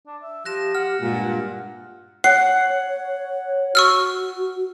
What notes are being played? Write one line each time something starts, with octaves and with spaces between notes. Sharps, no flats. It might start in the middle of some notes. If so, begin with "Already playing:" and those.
D4
E5
F3 G4 F#6 A#6 E7
F#5 F6
G2 A#2 G#3
C#5 F#5 C7
F#4 C#6 E6 F6